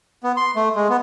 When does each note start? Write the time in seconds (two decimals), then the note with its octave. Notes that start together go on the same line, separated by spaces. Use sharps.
0.24 B3
0.37 C6
0.56 A3
0.76 G#3
0.89 B3